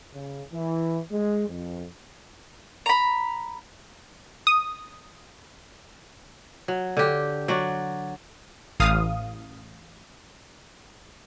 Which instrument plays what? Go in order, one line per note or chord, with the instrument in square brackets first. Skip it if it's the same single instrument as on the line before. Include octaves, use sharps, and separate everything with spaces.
[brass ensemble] C#3
E3
G#3
F2
[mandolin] A#5 B5
[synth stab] D#6
[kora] F#3
D3 G4
F#3 F#4 D5
[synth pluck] A1 F5 D#6